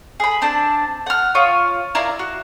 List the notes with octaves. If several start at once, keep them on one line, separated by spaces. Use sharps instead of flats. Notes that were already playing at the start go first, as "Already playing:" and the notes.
G#4 B5
C4 D4 A5
F#5 F6
F4 C#5 D#6
E4 A#4 D5 F5
F#4